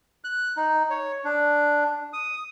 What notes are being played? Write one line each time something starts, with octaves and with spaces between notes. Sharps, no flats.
F#6
D#4
C#5
D4
D#6